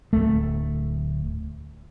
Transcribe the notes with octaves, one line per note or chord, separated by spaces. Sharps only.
D1 A3